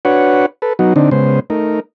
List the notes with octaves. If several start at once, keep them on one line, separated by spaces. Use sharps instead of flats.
D4 F#4 B4 C#5 F#5
A4 B4
F#3 B3 D#4 F#4
D3 C4 D4 D#4
C#3 G#3 B3 C5
A3 D#4 A#4